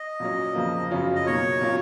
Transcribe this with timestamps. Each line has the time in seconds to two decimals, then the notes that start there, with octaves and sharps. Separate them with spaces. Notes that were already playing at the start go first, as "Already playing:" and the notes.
Already playing: D#5
0.20 A#2 F#3 C#4
0.55 F2 C#3 F3 A#3
0.91 F#2 C#3 F#3 C#4 F4
1.15 D#5
1.26 B2 F#3 A#3 D#4 C#5
1.61 A#2 F#3 C#4 F4